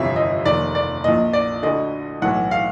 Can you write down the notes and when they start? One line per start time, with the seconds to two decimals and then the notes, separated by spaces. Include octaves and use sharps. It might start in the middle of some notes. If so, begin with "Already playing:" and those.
Already playing: G1 F2 C3 E3 E5
0.16 D#5
0.45 F1 D#2 D#3 D5
0.75 D5
1.04 A#1 A#2 D#5
1.33 D5
1.63 D2 D3 D#5
2.22 B1 A2 E3 F#5
2.51 F5